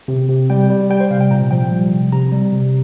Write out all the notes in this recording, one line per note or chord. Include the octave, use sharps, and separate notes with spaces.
C3
C3
G3 G5
G3
G3 G5
C5
C3 F5
G5
A#2 A#5
F3 G5
G3
C3
C3 A#5
G3
C3